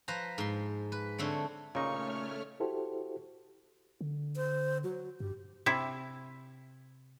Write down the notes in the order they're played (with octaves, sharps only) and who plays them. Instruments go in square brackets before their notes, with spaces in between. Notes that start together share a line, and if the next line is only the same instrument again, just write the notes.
[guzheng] F3 B4 C5 A#5
G#2 C6
B4
D3 A3 C4 C#5
[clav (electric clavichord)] A#2 D#4 [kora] C#3 [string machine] A3 C#5 F6 [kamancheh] C#6
[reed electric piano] E4 F#4 G4 A4 C5
[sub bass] D3
[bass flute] C5
F#3
[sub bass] G2 [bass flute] G4
[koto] C3 E4